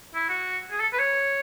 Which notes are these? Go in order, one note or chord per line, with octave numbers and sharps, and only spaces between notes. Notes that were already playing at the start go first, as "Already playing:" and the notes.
E4
F#4
G#4
A4
B4
C#5